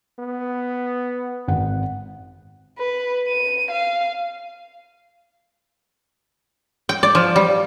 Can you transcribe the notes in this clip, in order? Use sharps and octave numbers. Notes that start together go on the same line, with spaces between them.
B3
G#1 F#5
B4
D#7
F5
G5
D5
F3
G3